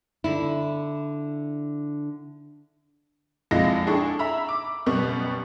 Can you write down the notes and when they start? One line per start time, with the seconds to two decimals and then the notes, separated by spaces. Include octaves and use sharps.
0.24 D3 E4
3.51 A#1 F2 G#3 E4 F4 A#6
3.87 D4 E4 G#4 A4 G5 C#6
4.19 E5 A#5 B5 E6
4.49 D6
4.86 F#2 B2 G3 B3 C#6